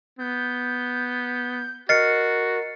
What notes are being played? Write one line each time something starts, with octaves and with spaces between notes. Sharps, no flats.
B3 G6
F#4 A#4 D#5 F6 A6 C7 C#7